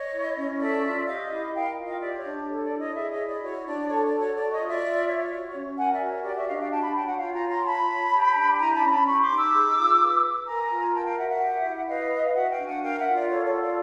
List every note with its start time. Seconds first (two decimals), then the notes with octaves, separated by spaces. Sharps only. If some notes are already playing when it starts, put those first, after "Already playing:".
Already playing: C#5 D#5
0.14 E4
0.37 C#4
0.60 A4 D5 E5
0.84 F4
1.07 G4 D#5 F5
1.30 E4
1.54 A#4 F5 G5
1.78 F4
1.85 D#5 F5
2.01 G4 D5 E5
2.17 C#5 D#5
2.24 D4
2.48 A4 C#5
2.63 D5
2.72 E4
2.79 C#5 D#5
2.95 G#4 D5 E5
3.11 C#5 D#5
3.19 E4
3.26 D5
3.42 F#4 C#5
3.66 D4 D5
3.89 A4 C#5
4.05 D5
4.13 F#4
4.21 C#5
4.36 A4 D5
4.51 C#5 D#5
4.60 F4
4.67 D5 E5
4.83 F4
5.07 C#5
5.31 F#4
5.54 C#4
5.77 A#4 F#5 G#5
5.92 D5 E5
6.00 F#4
6.09 C#5
6.24 G4 D5
6.36 D5 E5
6.47 D4 D#5 F5
6.59 F5 G5
6.71 F#4 G5 A5
6.82 A5 B5
6.95 C#5 G5 A5
7.06 F#5 G#5
7.18 F4 F5 G5
7.34 G#5 A#5
7.42 C#5
7.49 A#5 C6
7.65 F4 A5 B5
7.89 C#5
8.13 G4
8.36 D4
8.59 E4 G#5 A#5
8.75 A5 B5
8.82 C#4 A#5
8.90 A5 B5
9.06 G4 B5 C#6
9.21 C6 D6
9.30 D#4
9.37 D6 E6
9.53 G#4
9.76 F4
10.01 B4
10.24 B4
10.47 A#4 G#5 A#5
10.70 F4
10.94 A#4 G5 A5
11.05 F5 G5
11.18 F#4 E5 F#5
11.29 E5 F#5
11.41 G4
11.64 E4
11.88 B4 D#5 F5
12.11 B4
12.34 F#4 E5 F#5
12.50 F5 G5
12.58 D4
12.66 F#5 G#5
12.82 A#4 F5 G5
12.98 E5 F#5
13.06 F4
13.14 D5
13.28 A4 C#5
13.45 C#5
13.52 F4
13.60 D5